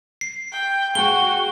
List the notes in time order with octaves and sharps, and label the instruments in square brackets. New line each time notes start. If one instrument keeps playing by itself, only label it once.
[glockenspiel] C7
[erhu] G5
[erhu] F#4 [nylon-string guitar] G#4 G5 [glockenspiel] G7